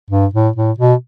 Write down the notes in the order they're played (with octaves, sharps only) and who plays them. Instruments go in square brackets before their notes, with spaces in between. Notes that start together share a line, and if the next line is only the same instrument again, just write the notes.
[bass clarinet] G2
A2
A2
B2